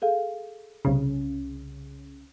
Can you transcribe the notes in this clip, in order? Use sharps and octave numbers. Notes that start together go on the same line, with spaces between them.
G#4 A4 F5
C2 C#3 C#4